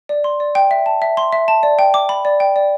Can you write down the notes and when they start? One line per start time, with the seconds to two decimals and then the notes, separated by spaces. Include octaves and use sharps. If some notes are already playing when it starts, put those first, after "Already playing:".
0.09 D5
0.24 C6
0.40 D5
0.55 G5
0.71 E5
0.86 A5
1.02 E5
1.17 C6
1.32 E5
1.48 A5
1.63 D5
1.79 G5
1.94 D6
2.09 B5
2.25 D5
2.40 G5
2.56 D5